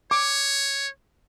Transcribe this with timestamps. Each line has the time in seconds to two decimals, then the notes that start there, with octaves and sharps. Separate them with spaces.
0.11 C#5 D6